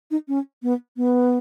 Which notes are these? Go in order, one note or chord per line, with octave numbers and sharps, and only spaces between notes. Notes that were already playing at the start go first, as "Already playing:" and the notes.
D#4
C#4
B3
B3